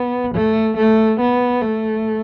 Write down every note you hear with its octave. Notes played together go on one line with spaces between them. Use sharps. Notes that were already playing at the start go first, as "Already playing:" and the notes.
Already playing: B3
A3
A3
B3
A3